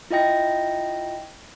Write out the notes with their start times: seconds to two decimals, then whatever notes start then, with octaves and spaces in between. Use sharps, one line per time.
0.11 E4 F4 D#5 G5 A#6